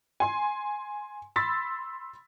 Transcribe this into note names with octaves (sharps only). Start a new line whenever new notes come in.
G#5 C6
B5 C6 E6 A6 B6